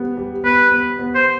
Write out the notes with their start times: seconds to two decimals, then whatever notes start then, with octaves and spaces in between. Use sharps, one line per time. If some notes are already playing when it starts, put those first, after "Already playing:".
Already playing: G3 B3
0.17 G3
0.44 B3 B4
0.72 B3
0.99 B3
1.15 C5